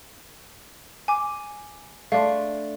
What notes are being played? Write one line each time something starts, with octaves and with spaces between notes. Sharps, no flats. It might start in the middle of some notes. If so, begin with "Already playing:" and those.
G#5 D6
A3 D4 F5 C6